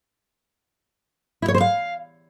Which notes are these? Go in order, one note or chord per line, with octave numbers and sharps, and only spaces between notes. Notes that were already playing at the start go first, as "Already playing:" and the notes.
E4
C#5
C5
F5